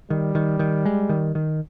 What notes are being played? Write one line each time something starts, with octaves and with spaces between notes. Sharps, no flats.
D#3 G3
D#3
D#3
G#3
D#3
D#3